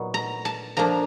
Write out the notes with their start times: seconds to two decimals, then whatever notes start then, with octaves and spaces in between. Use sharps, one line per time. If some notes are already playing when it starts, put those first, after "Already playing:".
Already playing: A#2 F#3 B3 D#4
0.14 A#5
0.45 A5
0.77 F3 A#3 D4 A#5